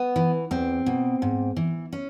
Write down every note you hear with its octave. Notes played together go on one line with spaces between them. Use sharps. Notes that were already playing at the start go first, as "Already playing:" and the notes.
Already playing: B3
E3
E2 C4
B2
G#2
E3
C#4